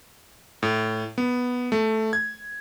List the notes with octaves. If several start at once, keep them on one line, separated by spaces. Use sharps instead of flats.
A2
B3
A3
G#6